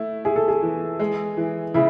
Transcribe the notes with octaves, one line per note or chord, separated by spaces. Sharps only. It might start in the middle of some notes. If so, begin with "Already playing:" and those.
Already playing: A3 E4
E4 G#4
A4
G#4
E3
G#3
E3
C#3 E4